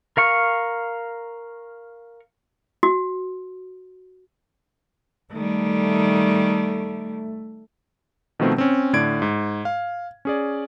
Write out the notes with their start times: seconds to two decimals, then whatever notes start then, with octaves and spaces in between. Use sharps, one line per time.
0.17 A#4 F5 C#6
2.83 F#4
5.33 D#3 G3 A3
8.40 B2 D#3 F3 A3 C4
8.58 C4 C#4
8.93 A2 D3 D5 G#6 D7
9.22 G#2
9.65 F5
10.25 C#4 G#4 D5